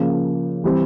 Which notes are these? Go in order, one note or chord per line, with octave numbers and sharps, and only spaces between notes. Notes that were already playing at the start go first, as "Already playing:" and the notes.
Already playing: C#3 F3 A#3
E3 G3 C4